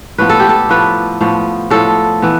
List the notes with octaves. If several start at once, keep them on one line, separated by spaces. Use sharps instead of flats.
A2 F3 B3 B4
A4
G4
A4
A2 F3 B3 B4
A2 F3 B3
A2 F3 B3 A4
E3 B3